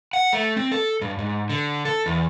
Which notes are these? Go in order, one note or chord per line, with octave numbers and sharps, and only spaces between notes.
F#5
A3
C4
A4
G2
G#2
D3
A4
E2